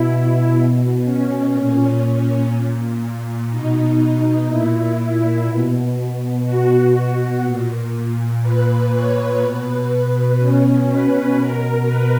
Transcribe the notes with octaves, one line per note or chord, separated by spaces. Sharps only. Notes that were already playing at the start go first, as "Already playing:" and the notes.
Already playing: B2 E4
B2
C#4
A#2 C#4
A#2
B2 D#4
A#2 E4
B2
B2 F#4
A#2
A#2 B4
C#5
B2 B4
B2 C#4
B4
B2 A#4
B4